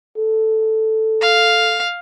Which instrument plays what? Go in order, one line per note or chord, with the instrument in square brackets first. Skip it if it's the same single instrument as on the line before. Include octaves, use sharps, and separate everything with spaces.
[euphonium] A4
[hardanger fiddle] F5